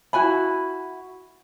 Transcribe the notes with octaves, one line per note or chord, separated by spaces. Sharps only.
E4 F#4 G#5 B5